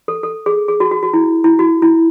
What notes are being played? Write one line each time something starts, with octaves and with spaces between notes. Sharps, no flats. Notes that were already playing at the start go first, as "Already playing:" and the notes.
A4
A4
G#4
G#4
F#4
F#4
F#4
E4
E4
F#4
E4